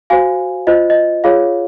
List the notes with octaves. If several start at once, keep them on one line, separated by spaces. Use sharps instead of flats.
F#4 C5 F5 G#5
F4 C5 D#5
D#5
F4 G#4 C#5 F5